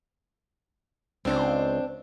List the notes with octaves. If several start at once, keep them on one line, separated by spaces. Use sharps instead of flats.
C#2 C4 D4 C5